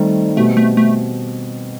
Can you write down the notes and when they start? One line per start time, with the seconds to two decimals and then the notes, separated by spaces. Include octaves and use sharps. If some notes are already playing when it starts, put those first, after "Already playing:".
Already playing: D#3 G3 A3 C4 D#4
0.37 B2 G3 A3 C4
0.57 A3
0.77 A3